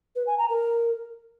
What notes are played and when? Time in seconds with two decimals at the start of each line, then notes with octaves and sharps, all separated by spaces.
0.16 B4
0.27 G#5
0.38 A#5
0.50 A#4